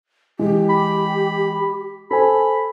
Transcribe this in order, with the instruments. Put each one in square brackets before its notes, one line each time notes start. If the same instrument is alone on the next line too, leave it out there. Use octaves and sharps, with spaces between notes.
[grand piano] E3 G#3 [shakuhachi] G4
[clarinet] B5
[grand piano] A4 C5 G#5 [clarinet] B5